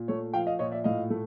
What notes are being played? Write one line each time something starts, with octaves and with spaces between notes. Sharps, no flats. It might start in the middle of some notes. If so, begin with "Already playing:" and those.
Already playing: A#2
A3 C#5
F3 F5 G5
D#5 F5
A#2 C#5 D#5
D5 E5
A2 D#5 F5
A3